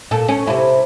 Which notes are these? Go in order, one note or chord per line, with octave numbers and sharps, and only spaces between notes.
A#2 A4
C#4
C3 E4